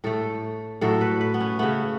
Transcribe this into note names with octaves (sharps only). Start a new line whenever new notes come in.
A2 A3 A4
A2 F#3 A3 A4
B4
B4
B3
C#4
C#3 A3 B3